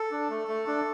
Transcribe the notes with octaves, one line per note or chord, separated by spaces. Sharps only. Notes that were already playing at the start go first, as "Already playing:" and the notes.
Already playing: A4
D4
A3
A3
D4